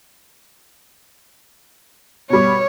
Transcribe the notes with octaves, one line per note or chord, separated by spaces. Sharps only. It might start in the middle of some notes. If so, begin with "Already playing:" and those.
B2 G3 C#5